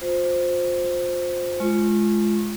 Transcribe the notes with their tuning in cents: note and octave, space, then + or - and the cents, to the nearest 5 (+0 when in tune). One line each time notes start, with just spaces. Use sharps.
F4 +35 C5 +0
G#3 +25 F4 -15 C#6 -35